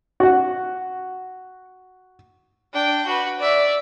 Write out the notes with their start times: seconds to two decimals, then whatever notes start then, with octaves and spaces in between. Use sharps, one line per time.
0.20 F#4 F#5
2.73 D4 G5
3.06 F#4 B4
3.39 D5 E5